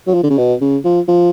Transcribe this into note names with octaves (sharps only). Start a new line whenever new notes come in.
F#3
F3
D3
C#3
B2
C#3
F3
F3